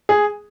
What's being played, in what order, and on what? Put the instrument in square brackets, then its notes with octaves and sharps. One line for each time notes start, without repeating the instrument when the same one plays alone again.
[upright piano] G#4